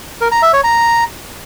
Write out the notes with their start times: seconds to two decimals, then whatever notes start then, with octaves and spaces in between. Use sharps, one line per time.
0.21 A#4
0.32 A#5
0.42 E5
0.53 C#5
0.64 A#5